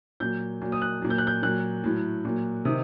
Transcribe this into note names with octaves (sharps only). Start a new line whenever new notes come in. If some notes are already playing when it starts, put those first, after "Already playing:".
A#2 F#3 G6
A#2 F#3
D#6
F#6
A#2 F#3
G6
F#6
G6
A#2 F#3 F#6
A2 F#3
A#2 F#3
C3 D#3 D#6